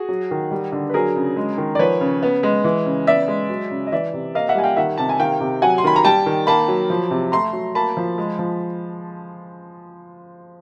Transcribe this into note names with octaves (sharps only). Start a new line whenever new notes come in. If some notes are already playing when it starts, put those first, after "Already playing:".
Already playing: F#4 G#4
F#3
D#3
G3
D3
B4
F#3 G#4 A#4
C#3
G#3
D#3
D5
F3 B4 C#5
C#3
B3
G#3
E3
C#3
B3 D5 E5
G#3
F#3
C#3
D#5
E3 D5 E5
C3
A#3 D#5 F5
E5 F#5
G3 G#5
F5 G5
D#3 E5 F#5
C3 A5
G#5
D#3 F5 G5
C3
F#3 F#5 G#5
C6
D#3 B5
A#5
G3 G5 A5
D#3
A#3 A5 B5
F#3
F3
C3
A3 A#5 C6
F#3
A#3 A5 B5
F3
G#3
F3